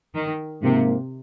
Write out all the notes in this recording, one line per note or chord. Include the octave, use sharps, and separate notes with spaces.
D#3
G#2 C3 F3 A#3